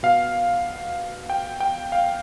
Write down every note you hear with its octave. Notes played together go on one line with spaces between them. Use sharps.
B2 F5
G5
G5
F5